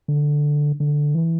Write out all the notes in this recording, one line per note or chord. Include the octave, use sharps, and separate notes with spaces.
D3
D3
E3